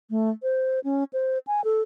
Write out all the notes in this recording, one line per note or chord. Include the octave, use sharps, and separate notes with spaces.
A3
C5
C#4
C5
G#5
A4